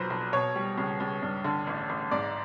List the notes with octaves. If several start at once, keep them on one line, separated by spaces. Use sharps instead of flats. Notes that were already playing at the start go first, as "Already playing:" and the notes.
Already playing: B1 A#2 F#3 B4 C5
B1
B2 C#5
G3
C#2
C#2
G2
D3
A1
A1
G#2 D5